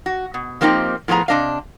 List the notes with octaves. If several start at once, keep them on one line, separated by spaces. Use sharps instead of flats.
F#4
B2
F3 A#3 C4 D#4 E4 G4
A2 F3 B3 G#4 A#5
C3 A#3 D4 D#5 F5